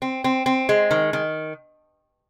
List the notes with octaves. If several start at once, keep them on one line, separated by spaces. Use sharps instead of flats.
C4
C4
C4
G#3
D#3
D#3